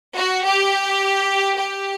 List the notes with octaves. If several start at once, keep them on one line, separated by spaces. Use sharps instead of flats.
F#4
G4
G4